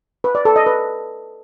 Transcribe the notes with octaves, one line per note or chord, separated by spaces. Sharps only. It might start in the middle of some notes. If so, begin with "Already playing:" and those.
B4
D5
A4
D#5
B4